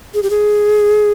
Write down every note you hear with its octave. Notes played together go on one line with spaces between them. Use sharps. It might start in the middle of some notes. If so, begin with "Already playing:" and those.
G#4
G4
G#4